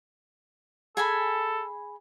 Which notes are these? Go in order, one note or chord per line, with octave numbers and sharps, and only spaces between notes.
G#4 A4 G#5 B5